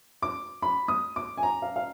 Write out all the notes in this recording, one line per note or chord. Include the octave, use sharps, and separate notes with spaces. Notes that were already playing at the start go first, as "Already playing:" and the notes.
D6
B5
D#6
D6
G#5
A#5
F5
F5